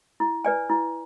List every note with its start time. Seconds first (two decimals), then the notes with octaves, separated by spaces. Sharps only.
0.20 E4
0.45 B4 D5 G#5
0.70 E4